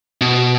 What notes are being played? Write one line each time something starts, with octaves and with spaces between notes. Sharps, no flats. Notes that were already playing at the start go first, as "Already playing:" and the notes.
B2